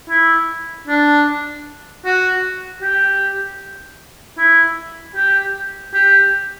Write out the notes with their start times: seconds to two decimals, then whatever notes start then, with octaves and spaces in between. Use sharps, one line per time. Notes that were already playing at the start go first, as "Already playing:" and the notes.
0.10 E4
0.88 D4
2.05 F#4
2.82 G4
4.38 E4
5.16 G4
5.94 G4